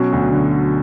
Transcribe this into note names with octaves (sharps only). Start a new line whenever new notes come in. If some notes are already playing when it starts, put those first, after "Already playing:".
Already playing: B2 F#3 C#4
D2
D3